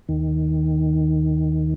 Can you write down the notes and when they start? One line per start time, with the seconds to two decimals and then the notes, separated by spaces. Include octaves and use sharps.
0.09 D#2 D#3